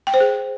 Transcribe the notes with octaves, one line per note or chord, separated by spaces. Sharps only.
G5
C5
G#4